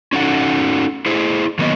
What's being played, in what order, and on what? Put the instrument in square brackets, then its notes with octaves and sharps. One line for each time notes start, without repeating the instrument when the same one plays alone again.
[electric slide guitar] C#4 D#4 F#4 A4 F#5
E4 G#4 C5
D#3 F#3 A#3 B3 D#5